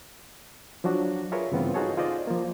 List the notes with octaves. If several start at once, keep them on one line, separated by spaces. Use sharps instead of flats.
F3 F#3 D4 F#4
F4 G#4 A#4 B4 C#5 E5
G2 C#3 E3 B3 C4 F4
D#4 F4 F#4 G#4 A4 C#5
F4 G#4 C5 D5 D#5
F3 A#3